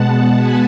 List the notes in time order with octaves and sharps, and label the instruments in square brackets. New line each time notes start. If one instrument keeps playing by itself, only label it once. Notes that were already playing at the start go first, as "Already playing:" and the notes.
Already playing: [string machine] B2 G#3 B3 F#5 A5
G#5 B5